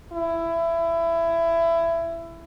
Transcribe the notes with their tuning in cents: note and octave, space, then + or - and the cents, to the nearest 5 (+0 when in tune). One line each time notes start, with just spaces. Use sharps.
E4 +20